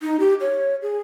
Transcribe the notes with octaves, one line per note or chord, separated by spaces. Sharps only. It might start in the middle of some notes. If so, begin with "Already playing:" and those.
D#4
G4
C#5
G#4